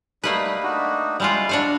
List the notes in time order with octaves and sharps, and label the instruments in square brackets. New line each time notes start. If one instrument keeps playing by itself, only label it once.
[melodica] G3 D#4 [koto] A3 A#3 B4
[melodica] D4 D#4 F#4
[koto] G3 G#3 F4 [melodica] E4
[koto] D4 F#4 F5